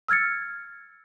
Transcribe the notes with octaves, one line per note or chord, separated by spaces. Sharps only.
E6 F6 G#6 A6 C#7